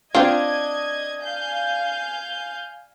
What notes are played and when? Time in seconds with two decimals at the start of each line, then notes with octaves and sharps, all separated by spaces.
0.15 C4 D4 F4 D#5 G#6
1.23 F5 G#5 G6